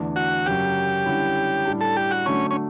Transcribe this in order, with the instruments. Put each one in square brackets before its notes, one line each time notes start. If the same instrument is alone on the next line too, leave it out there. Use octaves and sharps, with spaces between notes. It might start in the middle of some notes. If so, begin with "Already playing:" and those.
Already playing: [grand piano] E2 D3 A3 D4
[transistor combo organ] F#4
[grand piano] F#2 C#3 F#3 C#4 [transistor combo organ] G4
[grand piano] D3 G3 C#4 E4
A2 G3 D4
[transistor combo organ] A4
G4
F#4
[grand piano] D3 F#3 A3 D4 [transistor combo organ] C#4
[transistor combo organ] C#4